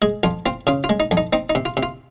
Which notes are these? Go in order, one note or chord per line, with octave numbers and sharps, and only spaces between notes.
G#3 G#4
F2 F4
C4 F4
C#3 F4
F4
G#3
D#4
F2
D#4
C4 D#4
D#4
C3
F4
C3
F4